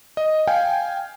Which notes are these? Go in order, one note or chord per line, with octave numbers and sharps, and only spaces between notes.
D#5
F5 G5 G#5